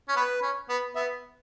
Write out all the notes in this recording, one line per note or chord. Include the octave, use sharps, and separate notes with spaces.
C#4
B3 B4
C#4
B3
B3 E5